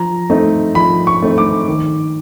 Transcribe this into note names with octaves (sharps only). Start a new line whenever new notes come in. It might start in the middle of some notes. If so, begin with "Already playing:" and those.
Already playing: F3 A#5
A3 C4 D#4
F3 B5
C#6
A3 C4 D#4
D6
D#3